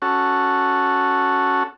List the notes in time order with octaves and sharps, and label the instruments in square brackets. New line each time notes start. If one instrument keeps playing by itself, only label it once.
[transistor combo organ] C#4 F#4 A4